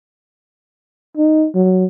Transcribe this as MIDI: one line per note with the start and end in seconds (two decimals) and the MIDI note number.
1.17 1.46 63
1.55 1.85 54